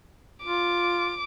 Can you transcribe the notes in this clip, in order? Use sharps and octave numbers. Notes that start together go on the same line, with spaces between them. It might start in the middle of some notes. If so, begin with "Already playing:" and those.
F4 D6